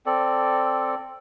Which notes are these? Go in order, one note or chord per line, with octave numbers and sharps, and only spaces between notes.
C4 A4 D5